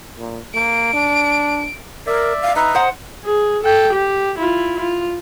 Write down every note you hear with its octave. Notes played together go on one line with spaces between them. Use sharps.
A#2
A#3 D7
D4
A#4 D5 E5
F5
D#4 B4 E5 A#5
C5 D#5 F#5
G#4
A4 G5
G4
E4 F4
F4